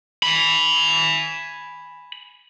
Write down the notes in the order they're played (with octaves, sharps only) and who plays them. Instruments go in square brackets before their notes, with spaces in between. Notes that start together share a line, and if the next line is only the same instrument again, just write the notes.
[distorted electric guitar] G#5 B5